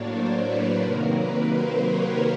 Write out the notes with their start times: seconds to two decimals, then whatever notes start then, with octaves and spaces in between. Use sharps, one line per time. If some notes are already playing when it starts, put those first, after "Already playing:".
Already playing: A2 F#3 A#3 D4 C#5 D5
0.08 C5
0.44 B4
0.79 C3 D#3 F#3 A#3 A#4
1.15 B4
1.51 C5
1.87 C#5